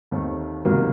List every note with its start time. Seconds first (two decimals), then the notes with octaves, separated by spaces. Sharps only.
0.11 D#2 D#3 A3 C4
0.65 C#2 C3 D#3 F#3 A#3